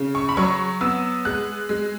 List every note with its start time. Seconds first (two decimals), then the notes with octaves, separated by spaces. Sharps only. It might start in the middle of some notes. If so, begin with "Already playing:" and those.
Already playing: C#3
0.15 C#6
0.29 B5
0.37 F#3 C#6
0.81 B3 E6
1.25 G#3 F#6
1.69 G#3